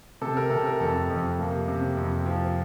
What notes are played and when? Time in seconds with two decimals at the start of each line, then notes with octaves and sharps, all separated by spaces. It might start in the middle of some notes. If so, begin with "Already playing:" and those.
0.21 C3 A4
0.37 A#4
0.50 C3 A4
0.66 A#4
0.80 F2 A4
1.10 F2
1.39 C3 A#3
1.68 C3
1.97 F2
2.26 F3